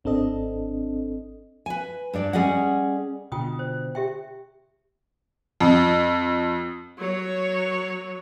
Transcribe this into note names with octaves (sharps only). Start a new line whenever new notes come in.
G#1 C4 D4 A4 D#5
B4 G#5
G2 D4 D5
G3 C#4 G#4 D5 D#5 F#5
B2 D3 F4 G5 D#6
C5
G4 E5 G5
F2
F#3 C#5